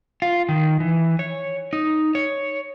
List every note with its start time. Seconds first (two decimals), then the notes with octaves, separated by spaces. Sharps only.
0.22 F4
0.49 D#3
0.80 E3
1.19 C#5
1.73 D#4
2.15 C#5